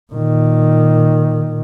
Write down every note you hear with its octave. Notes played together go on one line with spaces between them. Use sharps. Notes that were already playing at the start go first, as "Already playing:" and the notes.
A#2 D#3